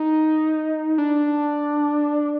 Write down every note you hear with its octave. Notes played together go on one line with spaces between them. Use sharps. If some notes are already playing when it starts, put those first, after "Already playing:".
Already playing: D#4
D4